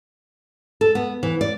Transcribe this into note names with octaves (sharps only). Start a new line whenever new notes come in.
A4
B3
E3
D5